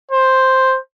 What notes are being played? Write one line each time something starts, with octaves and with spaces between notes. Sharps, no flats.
C5